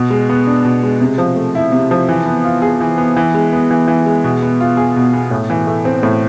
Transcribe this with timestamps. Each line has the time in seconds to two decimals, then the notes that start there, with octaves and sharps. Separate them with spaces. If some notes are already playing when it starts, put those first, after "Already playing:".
Already playing: B2
0.10 G#3
0.29 B3
0.47 D4
0.65 B2
0.83 G#3
1.01 C3
1.18 F3
1.36 A3
1.55 E4
1.72 C3
1.91 F3
2.09 E3
2.26 B3
2.45 F4
2.62 G#4
2.81 E3
2.98 B3
3.17 E3
3.34 G#3
3.53 B3
3.71 E3
3.88 E3
4.06 G#3
4.24 B2
4.42 B3
4.60 F4
4.77 G#4
4.96 B2
5.13 B3
5.31 A2
5.50 E3
5.67 A3
5.85 C4
6.03 A2